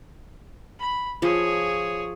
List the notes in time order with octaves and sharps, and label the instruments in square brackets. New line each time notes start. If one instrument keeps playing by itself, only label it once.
[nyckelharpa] B5
[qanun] F3 [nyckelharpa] G#4 C#5